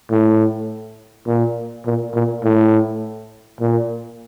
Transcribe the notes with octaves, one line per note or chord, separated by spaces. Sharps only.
A2
A#2
A#2
A#2
A2
A#2